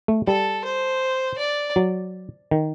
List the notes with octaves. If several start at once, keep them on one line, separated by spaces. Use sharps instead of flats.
A3
G3 A4
C5
D5
F#3
D#3